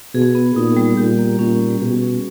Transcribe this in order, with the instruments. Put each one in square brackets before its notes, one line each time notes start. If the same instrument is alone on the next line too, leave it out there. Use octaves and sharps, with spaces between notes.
[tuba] B2 [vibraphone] G#4
[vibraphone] B3
[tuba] A#2 [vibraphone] D#4
[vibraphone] G3
[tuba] A#2 [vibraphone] G4
[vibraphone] A#3
[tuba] A#2 [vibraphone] C#4
[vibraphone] G3
[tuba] B2 [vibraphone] G#4
[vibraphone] C#4